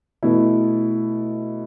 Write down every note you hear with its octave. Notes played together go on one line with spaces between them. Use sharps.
B2 A3 E4